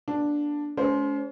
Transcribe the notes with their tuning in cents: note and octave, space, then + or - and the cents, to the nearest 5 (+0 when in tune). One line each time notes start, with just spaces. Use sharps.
A#3 +45 D4 +0
A3 -45 C#4 +35 C5 +0